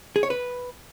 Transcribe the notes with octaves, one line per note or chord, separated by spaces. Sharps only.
G#4
C#5
B4